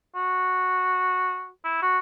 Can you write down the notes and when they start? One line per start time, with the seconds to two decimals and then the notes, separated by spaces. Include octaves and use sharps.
0.16 F#4
1.64 E4
1.82 F#4